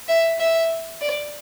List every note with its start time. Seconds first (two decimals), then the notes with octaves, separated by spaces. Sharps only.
0.08 E5
0.39 E5
1.01 D5